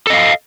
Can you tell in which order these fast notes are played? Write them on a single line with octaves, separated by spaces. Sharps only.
A4 D#5 F5